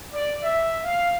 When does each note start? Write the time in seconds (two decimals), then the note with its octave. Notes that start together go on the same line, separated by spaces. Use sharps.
0.11 D5
0.41 E5
0.84 F5